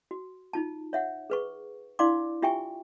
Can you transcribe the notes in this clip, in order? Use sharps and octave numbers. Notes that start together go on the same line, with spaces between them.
F#4
D#4 F4 A5
C#5 E5 F#5
G#4 B4 C#6
D4 E4 D5 F5 C6 D6
F4 G4 E5 G5 G#5 C#6